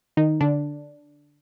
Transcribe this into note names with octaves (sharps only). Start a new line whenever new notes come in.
D#3 D#4
D3 D4